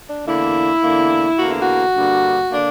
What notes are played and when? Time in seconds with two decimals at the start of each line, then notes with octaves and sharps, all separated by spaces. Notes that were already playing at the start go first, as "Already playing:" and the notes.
0.08 D4
0.26 E2 D3 A#3 E4
0.82 E2 D3 A#3
1.39 E2 D3 A#3 F#4
1.50 E4
1.62 F#4
1.95 G2 D3 A#3
2.50 D3 A#3 D4